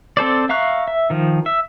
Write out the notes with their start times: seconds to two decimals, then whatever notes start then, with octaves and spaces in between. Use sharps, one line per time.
0.17 C4 A4 C5 D5
0.49 E5 F5 A#5 C#6 F#6
0.88 E5
1.10 D#3 F3
1.46 E5